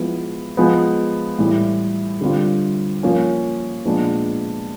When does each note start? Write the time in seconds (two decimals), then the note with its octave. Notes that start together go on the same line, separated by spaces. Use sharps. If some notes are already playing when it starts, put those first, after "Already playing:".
Already playing: F3 G#3 B3 E4
0.57 F3 G#3 B3
1.39 A2 E3 G3
2.21 D3 G3 C4 F4
3.03 F3 A#3 C#4
3.85 A#2 F3 G#3 B3 D4